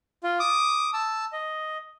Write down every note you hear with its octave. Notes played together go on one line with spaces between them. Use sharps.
F4
D6 D#6
A5 E6
D#5